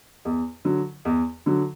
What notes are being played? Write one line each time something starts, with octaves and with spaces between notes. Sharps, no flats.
E2
D3 F#3
E2
D3 F#3